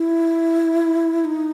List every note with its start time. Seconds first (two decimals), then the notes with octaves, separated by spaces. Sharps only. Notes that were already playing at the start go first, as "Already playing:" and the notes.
Already playing: E4
1.25 D#4